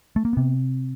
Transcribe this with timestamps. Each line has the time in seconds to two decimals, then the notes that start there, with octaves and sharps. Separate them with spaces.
0.16 A3
0.25 A#3
0.33 C3 B3